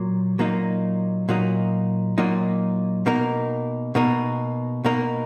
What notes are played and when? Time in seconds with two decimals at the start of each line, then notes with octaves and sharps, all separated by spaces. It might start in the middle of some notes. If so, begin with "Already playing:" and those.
Already playing: A#2 F#3 A#3
0.39 A#2 F#3 A#3 D#4
1.29 A#2 F#3 A#3 D#4
2.18 A#2 F#3 A#3 D#4
3.06 B2 A#3 D#4 A#4
3.95 B2 A#3 D#4 A#4
4.84 B2 A#3 D#4 A#4